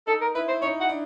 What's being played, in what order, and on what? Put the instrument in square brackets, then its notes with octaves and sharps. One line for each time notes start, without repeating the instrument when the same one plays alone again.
[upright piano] D#4 [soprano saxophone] A4
[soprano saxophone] A#4
[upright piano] E4 [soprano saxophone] B4
[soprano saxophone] C5
[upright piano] D#4 [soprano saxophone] C#5
[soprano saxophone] F#5
[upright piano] D4